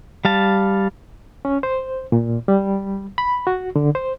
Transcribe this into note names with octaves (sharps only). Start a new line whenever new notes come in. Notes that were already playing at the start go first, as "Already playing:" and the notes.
G3 F5 A5
C#4
C5
A#2
G3
B5
F#4
D3
C5